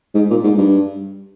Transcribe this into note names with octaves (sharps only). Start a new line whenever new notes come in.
G#2
A#2
G#2
G2